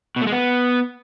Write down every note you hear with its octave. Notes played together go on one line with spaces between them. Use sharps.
B2
A3
G#3
B3